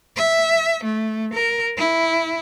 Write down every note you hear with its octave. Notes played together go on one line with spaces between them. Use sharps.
E5
A3
A#4
E4